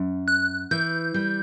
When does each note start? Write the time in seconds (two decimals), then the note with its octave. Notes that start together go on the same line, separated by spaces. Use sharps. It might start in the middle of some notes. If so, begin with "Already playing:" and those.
Already playing: F#2
0.28 F#6
0.71 E3 G6
1.14 G3